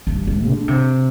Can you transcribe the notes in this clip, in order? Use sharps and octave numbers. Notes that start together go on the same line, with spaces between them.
G2
G#2
D3
C3